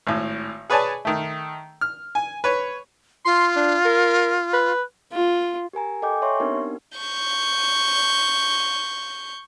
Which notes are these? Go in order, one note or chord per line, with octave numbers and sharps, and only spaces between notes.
G#1 A2
G#4 B4 C#5 D5 G#5 A5
D#3 A3
F6
G#5
B4 C#5
F4 C6
D4
A#4
B4
F4
G4 A#4 G#5 A#5
A4 D#5 G5 G#5 D6 G6
C#5 E5 C6 C#6
B3 C4 D4 D#4 G4 A#4
D4
C#6 G6